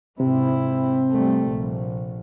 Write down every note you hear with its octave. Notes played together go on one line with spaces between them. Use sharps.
G#2 C3 C4 E4
G3 A3
A#1